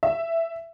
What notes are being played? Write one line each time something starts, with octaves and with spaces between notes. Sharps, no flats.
E5